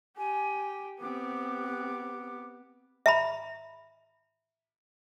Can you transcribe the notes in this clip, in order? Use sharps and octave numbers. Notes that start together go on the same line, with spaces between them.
G4 G#5
B3 C4 G4 D6
E5 A#5 B5